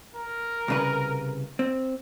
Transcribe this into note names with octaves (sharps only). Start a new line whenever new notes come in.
A#4
C2 C#3 B4
C4